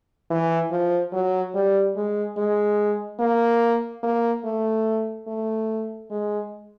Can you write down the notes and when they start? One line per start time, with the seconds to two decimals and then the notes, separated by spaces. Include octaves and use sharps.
0.30 E3
0.72 F3
1.12 F#3
1.55 G3
1.96 G#3
2.37 G#3
3.20 A#3
4.03 A#3
4.45 A3
5.28 A3
6.10 G#3